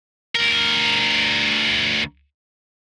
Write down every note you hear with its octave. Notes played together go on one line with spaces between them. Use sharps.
D2 A#4